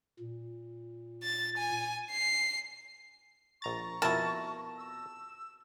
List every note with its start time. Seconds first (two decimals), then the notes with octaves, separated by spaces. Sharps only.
0.19 A#2
1.23 A6
1.57 G#5
2.11 C7
3.62 A#1 A#5 C#6 A6
4.02 F2 B2 E4 A#4 A5 A#6
4.78 E6